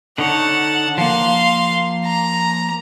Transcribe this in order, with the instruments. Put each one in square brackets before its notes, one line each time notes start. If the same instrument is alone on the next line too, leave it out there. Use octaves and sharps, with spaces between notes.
[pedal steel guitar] D3 D#4 C#5 [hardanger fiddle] F#5 A5
[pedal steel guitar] F3 A#3 [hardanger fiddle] F5 C6
[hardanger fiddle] A#5